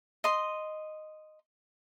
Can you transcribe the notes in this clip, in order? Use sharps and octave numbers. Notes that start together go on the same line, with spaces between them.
D#5 C6